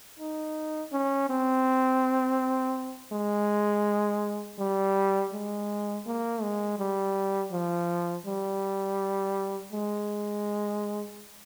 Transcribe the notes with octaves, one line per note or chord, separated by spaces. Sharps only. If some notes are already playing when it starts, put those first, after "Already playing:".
D#4
C#4
C4
G#3
G3
G#3
A#3
G#3
G3
F3
G3
G#3